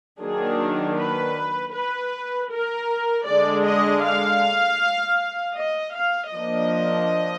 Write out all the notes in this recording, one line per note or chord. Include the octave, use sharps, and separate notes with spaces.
D#3 F#3 A#3 D4 G#4
B4
B4
A#4
D3 G#3 D4 D5
D#5
F5
D#5
F5
F3 A#3 D4 D#5